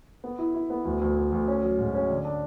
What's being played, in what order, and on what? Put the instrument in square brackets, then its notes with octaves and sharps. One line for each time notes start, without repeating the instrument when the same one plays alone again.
[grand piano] B3
E4
E4
B3
D2
D2
D2
D2
C#4
F#3
G#2
C#4
D3
D4